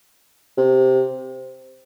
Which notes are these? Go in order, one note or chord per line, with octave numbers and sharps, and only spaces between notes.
C3